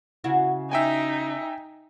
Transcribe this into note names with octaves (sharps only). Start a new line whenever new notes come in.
C#3 E4 F#4
D#4 E5 G5 G#5